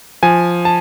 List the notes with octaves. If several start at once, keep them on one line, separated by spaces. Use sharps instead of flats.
F3 G#5
A5